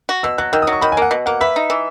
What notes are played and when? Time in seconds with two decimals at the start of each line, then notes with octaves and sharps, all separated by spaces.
0.09 F#4
0.23 B2 E6
0.38 F#3 F#6
0.53 D#3 E6
0.62 F#3 D#6
0.72 C#6
0.81 D#3 B5
0.92 G#5
0.97 A#3 F#5
1.11 B2
1.26 A#3 F#5
1.41 B4 E5
1.56 D#4
1.70 E3